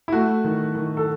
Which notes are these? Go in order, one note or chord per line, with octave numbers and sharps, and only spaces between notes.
E4
A3 F#4
D#3
D#3
A4